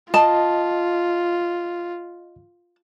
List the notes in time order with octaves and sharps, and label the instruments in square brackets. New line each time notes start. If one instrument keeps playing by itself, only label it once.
[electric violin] F4 [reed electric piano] D#5 [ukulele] A5